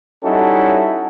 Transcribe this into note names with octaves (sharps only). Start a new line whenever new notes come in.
G3 C#4 D#4 E4 F#4 A4